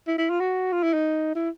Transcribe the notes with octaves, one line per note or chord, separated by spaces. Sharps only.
E4
E4
F4
F#4
F4
E4
D#4
E4